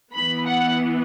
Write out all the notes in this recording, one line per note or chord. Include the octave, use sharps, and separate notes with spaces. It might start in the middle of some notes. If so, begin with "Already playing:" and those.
E3 B3 B5
F#5